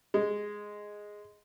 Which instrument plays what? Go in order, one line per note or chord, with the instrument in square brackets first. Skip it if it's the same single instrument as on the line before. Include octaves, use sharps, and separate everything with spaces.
[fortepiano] G#3